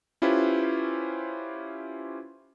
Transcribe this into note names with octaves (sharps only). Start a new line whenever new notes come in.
C#4 E4 F4 G4 B4 C5